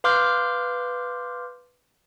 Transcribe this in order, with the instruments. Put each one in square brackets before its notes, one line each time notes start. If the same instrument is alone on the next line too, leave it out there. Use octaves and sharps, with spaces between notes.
[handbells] B4 F5 C6 D6 F6 G6